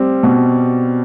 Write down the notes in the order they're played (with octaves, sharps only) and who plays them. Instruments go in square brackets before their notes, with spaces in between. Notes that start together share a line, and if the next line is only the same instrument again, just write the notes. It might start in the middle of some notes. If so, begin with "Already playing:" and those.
Already playing: [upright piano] G3 C4
B2